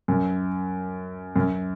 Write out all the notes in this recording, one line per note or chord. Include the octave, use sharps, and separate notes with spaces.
F#2
F#2